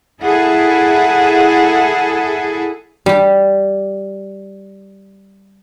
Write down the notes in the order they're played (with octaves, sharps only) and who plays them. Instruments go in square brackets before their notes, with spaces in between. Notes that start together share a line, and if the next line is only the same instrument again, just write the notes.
[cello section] E4 G#4 A4 [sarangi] F#5
[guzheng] G3 G4